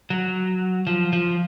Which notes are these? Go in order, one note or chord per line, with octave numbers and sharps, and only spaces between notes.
F#3
F3
F3